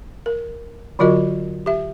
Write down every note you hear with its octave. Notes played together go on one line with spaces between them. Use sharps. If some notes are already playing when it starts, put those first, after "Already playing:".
A#4
D3 F#3 F4 F#4 A#4 D#5
G4 E5